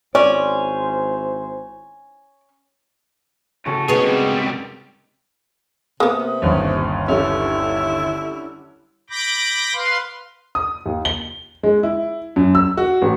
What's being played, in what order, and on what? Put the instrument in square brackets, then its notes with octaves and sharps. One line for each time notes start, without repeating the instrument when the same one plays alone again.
[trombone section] G#1 E4 C5 [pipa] C#4 [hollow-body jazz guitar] D5
[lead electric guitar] A2 A4 [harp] C#3 C#4 F#4
[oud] B3 G#4 [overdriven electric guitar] C#4 C#5 [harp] D#4 F#4 A#4
[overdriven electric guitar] C#2 C3 [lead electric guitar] G3
[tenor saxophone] C3 [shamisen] A#3 B3 [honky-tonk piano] D#6
[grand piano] G1 D#2 [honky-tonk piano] C#4
[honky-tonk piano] D3 G3 C#4 [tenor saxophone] E4
[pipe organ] B5 D6 G6 A#6
B4 F5 C6
[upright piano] D#6
D#2
G7
G#3
E4
F#2
E6
F#4
A1